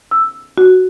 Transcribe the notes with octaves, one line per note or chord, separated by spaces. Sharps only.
E6
F#4